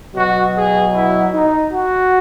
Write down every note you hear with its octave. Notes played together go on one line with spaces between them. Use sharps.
B2 F#3 F#4
G#4
E4
D#4
F#4